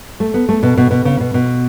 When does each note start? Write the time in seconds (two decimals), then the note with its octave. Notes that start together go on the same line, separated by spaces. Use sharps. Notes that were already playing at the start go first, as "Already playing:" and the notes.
0.20 A3
0.34 B3
0.49 A3
0.63 B2
0.77 B2
0.91 B2
1.05 C#3
1.20 B2
1.34 B2